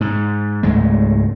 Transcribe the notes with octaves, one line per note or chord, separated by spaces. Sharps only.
G#2
C#2 G#2 G#3 A3